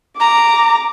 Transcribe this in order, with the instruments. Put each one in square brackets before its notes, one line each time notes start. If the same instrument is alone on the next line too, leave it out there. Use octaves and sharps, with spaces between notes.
[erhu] A#5 [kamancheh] D6